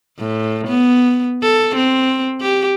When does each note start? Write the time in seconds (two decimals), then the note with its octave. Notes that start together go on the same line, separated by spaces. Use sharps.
0.19 A2
0.67 B3
1.42 A4
1.76 C4
2.41 G4